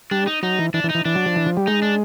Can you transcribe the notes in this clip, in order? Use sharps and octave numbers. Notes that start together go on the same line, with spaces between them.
G3 D4
D#4
F#3 D#4
E3
E3 D4
E3
D#4
E3
E3 D4
F#3
F3
E3
F3
G3
G#3 D#4
D4